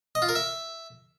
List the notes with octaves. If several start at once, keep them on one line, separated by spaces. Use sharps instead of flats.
D#5
F4
A#4
E5